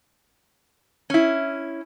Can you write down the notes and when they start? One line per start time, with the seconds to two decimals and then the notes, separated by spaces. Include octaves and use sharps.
1.10 C#4 E4